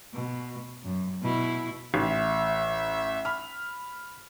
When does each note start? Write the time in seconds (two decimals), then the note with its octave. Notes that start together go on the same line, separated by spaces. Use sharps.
0.13 B2
0.83 F#2
1.22 B2 E4
1.94 A1 E5
3.25 B5 F6